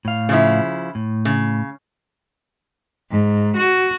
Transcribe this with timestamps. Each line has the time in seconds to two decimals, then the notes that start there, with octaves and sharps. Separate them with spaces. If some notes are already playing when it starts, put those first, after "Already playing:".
0.05 A2 F5
0.29 C#3 F3 E4
0.95 A2
1.25 C#3
3.12 G#2
3.57 F#4